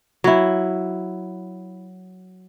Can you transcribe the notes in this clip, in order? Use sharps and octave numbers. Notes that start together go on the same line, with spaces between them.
F#3 E4